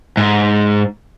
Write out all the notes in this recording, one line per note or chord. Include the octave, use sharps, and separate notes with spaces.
G#2